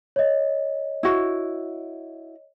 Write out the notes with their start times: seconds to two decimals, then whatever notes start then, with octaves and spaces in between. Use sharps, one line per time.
0.16 C#5 D#5
1.03 E4 F#4